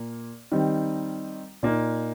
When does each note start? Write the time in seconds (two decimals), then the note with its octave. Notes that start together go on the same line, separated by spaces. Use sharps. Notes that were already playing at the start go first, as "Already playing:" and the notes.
Already playing: A#2 A#3
0.52 D#3 G3 C4 D#4
1.63 A#2 A#3 D#4